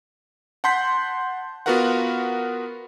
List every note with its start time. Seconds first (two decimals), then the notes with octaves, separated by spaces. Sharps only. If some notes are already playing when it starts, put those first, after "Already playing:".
0.64 F#5 A5 C6 G6 B6
1.66 B3 F4 F#4 A#4 B4 F#5